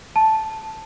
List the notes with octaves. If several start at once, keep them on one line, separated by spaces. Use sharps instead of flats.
A5